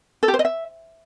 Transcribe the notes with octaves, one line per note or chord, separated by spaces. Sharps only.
A4
G4
C5
D#5
E5